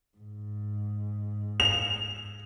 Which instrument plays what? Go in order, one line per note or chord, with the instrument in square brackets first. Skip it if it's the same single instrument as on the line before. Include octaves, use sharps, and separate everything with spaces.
[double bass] G#2
[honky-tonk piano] F7